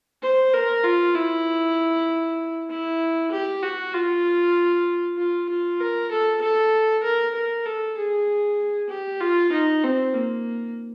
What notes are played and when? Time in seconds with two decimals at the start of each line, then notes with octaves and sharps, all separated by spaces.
0.23 C5
0.54 A#4
0.84 F4
1.15 E4
2.70 E4
3.32 G4
3.63 F#4
3.94 F4
5.18 F4
5.49 F4
5.80 A#4
6.12 A4
6.42 A4
7.03 A#4
7.35 A#4
7.66 A4
7.98 G#4
8.90 G4
9.21 F4
9.52 D#4
9.83 C4
10.15 A#3